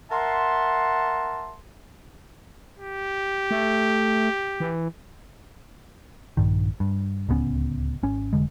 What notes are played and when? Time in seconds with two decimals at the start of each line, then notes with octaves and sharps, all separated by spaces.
0.11 A#4 E5 F#5 A5 C6
2.79 G4
3.51 A3
4.60 E3
6.37 A#1 G2 D#3
6.80 G2
7.29 D1 C#2 B3 C#4
8.03 G#1 C#4
8.33 F1 F#2 D3 G#3